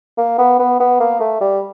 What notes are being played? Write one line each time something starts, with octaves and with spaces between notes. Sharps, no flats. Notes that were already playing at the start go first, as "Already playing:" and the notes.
A#3
B3
B3
B3
A#3
A3
G3